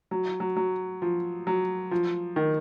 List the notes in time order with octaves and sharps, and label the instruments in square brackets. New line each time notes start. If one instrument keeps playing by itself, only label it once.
[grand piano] F#3
F#3
F#3
F3
F#3
F3
D#3